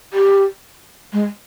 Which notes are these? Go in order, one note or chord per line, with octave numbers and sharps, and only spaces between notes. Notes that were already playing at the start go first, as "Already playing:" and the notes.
G4
G#3